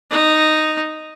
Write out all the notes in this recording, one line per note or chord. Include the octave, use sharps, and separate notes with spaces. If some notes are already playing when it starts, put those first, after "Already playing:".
D#4